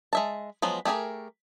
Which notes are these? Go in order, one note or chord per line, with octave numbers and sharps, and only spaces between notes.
G#3 E5 A5
F3 F#3 G#3 B3
A3 G4 G#4 A#4